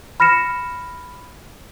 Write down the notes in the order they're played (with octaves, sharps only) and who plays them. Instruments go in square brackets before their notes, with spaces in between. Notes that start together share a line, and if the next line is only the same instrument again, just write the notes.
[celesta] B5 F6 A#6 C#7 E7